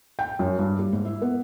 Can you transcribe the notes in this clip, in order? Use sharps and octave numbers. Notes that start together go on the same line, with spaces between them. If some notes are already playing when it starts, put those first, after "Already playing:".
G5
F#2
G2
G3
G#2
E4
B3